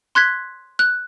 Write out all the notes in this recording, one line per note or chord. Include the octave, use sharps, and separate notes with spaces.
C6 F#6 G#6 B6
F#6